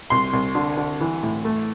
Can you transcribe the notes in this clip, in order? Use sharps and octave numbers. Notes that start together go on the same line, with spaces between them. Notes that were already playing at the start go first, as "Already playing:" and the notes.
C2 C6
C2
D3
D3
E3
A2
A3